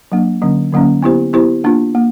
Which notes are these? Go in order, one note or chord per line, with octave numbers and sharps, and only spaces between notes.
F#3 A#3 D4
D3 F#3 A#3 C#4
D3 F#3 A#3 C#4
B3 E4 G4 C5
B3 E4 G4 C5
A#3 D4 F4
A#3